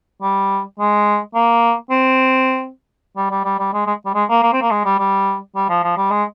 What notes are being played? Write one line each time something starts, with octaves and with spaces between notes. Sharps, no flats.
G3
G#3
A#3
C4
G3
G3
G3
G3
G#3
G#3
G3
G#3
A#3
A#3
C4
A#3
G#3
G3
G3
G3
F3
F3
G3
G#3